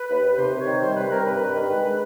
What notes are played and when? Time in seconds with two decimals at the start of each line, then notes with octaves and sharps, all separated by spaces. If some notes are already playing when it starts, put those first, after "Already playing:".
Already playing: B4
0.09 D#2
0.23 D#2
0.37 C3 C5
0.52 C3
0.60 C#5
0.67 D#3
0.81 G3 C5
0.96 C3 B4
1.11 C3 A#4
1.26 G2 B4
1.40 G2
1.55 D#3
1.70 G#3